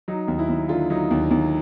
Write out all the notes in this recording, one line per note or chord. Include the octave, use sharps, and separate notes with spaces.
F#3 D#4
D#2
E4
D#2
D3 F4
F#3 D#4
D#2
D#2